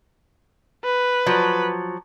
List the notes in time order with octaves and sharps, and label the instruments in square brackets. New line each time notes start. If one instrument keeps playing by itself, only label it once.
[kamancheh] B4
[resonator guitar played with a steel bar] F3 F#3